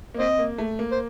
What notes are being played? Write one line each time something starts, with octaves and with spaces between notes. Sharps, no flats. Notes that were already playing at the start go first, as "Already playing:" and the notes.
A#3
C4 C5 D#5
A#3
A3
A#3
C5